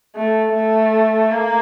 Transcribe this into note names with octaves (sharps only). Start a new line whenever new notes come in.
A3
A3
A#3